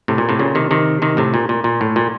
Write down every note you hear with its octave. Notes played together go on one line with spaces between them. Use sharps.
A2 C3
A#2
A2 C3
A#2 C#3
C3 D#3
C3 D#3
C3 D#3
A2 C3
A#2
A#2
A#2
A2
A#2